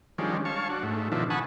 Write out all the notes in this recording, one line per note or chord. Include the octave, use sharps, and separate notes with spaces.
D#3 F3 G3 G#3 C#4 D4
C#5 F5 A5 C#6
D4 F#4
G#2 A3
B2 D#3 F3 D4 E4
F#5 G#5 A5 B5 C#6 D#6